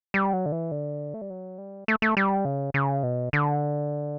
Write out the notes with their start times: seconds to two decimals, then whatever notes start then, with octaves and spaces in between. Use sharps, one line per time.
0.14 G3
0.33 F#3
0.46 D3
0.52 E3
0.71 D3
1.14 A3
1.21 G3
1.30 F#3
1.58 G3
1.88 A3
2.02 A3
2.17 G3
2.45 C#3
2.74 C#3
3.03 B2
3.33 D3